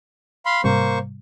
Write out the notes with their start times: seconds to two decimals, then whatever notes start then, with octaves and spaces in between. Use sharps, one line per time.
0.46 F5 B5 C6
0.64 G#2 C3 G3 A#3 C5 C#6